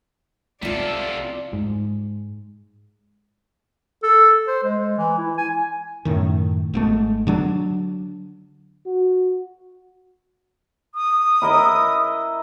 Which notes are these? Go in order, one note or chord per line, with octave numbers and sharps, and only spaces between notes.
C2 C3 E4 F4 A4 D5
G#2
A4
C5
G#3
E3
E4
G#5
F#2 A2 D#3
G#1 G#2 A3
D3 F#3 D4
F#4
D#6
E4 A#4 D#5